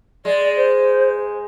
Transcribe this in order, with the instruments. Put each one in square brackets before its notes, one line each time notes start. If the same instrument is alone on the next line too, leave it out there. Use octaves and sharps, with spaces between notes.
[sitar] G#3 [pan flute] D5
[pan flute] C5